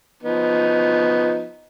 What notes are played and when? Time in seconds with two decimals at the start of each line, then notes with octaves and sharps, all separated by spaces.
0.23 F3 B3 D#4